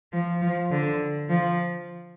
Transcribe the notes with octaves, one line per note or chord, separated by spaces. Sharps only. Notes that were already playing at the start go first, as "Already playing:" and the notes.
F3
F3
D3
F3